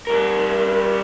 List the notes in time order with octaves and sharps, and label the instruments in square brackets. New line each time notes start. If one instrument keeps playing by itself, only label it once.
[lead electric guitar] G3 A#4